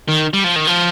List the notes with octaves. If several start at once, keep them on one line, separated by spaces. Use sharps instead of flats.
D#3
G3
F3
D#3
F3